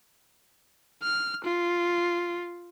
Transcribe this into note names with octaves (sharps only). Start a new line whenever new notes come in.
F6
F4